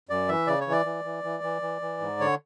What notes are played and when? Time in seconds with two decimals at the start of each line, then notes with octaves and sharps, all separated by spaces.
0.09 F#2 D5
0.28 E3 E5
0.47 C#3 D5
0.60 C#5
0.67 E3
0.72 D5
0.86 E3
1.04 E3
1.24 E3
1.43 E3
1.62 E3
1.81 E3
2.00 G#2
2.20 D3 C#5